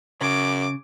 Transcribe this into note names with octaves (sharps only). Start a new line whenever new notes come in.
F#2 C#3 D6